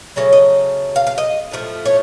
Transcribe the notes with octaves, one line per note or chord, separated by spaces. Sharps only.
C#3 F#3 A3 C#5
D#5
F5
F5
D#5
A2 F3 A3
C#5